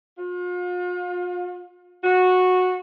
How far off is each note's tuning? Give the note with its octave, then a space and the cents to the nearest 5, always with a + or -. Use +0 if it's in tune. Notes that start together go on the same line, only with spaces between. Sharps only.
F4 +40
F#4 -15